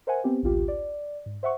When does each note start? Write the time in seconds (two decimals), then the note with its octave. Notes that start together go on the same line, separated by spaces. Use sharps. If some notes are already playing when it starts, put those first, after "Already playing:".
0.07 A#4 C5 E5 F#5 G#5
0.24 B3 C4 G4
0.43 A1 D2 F4 G4
0.68 D5
1.26 G#2
1.43 C5 E5 F#5 C#6